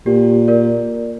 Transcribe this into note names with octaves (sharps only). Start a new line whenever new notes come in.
A#2 G4
A#4 D5